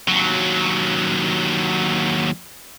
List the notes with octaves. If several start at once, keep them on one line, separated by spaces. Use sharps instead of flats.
D#2 F#3